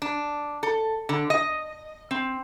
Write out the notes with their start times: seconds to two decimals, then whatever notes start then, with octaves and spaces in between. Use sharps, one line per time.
0.02 D4
0.63 A4
1.09 D3
1.30 D#5
2.11 C4